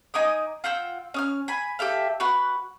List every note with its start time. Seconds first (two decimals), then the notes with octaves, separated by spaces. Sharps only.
0.14 D#4 G#5 D6 D#6
0.64 F4 F#5 G5 E6
1.14 C#4 D#6 F6
1.48 G#5 B5
1.79 G4 A4 E5 F5
2.20 F#4 B4 F#5